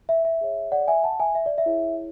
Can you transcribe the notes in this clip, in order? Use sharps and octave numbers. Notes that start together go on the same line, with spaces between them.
E5
E5
G#4 C#5
D5 F#5
E5 G#5
F#5 A5
E5 G#5
E5
D5
E5
E4 G#4 C#5